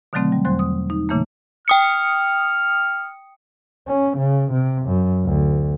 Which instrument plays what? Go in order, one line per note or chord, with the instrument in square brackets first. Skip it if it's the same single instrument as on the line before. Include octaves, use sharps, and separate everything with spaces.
[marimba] B2 D3 D#3 F#3 A3 C4
G3
E2 F#3 C5 C6 F#6
D#6
D#4
A#2 C#3 E3 A3 A#3
[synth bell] G5 D#6 C#7 [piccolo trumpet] F6
[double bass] C#4
C#3
C3
F#2
D2